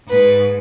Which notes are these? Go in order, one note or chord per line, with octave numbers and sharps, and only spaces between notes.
G#2 B4